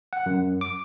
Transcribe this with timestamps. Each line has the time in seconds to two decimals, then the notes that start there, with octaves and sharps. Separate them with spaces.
0.13 F#5
0.26 F#2
0.61 D6